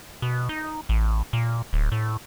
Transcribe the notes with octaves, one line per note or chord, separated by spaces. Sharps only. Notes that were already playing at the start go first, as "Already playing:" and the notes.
B2
D#4
A1
A#2
D1
A2